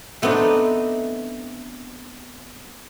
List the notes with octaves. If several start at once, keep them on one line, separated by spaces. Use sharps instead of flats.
A3 B3 C4 D4 D#4